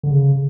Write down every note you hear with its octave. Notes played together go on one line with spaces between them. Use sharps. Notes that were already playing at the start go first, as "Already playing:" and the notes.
D3
C#3